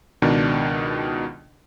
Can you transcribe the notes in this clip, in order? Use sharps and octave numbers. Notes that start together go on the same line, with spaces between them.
C#2 B2 D#3 D4